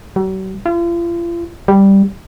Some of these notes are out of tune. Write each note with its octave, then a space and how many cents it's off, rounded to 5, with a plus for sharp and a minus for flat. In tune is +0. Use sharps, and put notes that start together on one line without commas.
F#3 +45
F4 -40
G3 +0